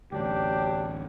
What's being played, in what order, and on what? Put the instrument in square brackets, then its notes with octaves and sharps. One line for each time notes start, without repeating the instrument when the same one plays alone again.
[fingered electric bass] A1 D2 [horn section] F#3 D4 G4